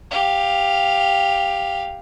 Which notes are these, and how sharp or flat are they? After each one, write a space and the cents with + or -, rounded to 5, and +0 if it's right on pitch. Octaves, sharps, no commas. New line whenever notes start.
G4 +10 F5 +0